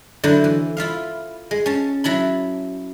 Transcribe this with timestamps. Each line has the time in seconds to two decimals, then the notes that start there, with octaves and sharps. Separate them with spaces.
0.24 D3 F#3 E4 C5
0.44 E3
0.77 E4 F4 E5 F5
1.51 G#3
1.66 C#4 A5
2.04 F#3 E4 A5 B5